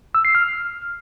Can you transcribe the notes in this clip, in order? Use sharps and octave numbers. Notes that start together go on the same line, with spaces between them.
E6
C7
F6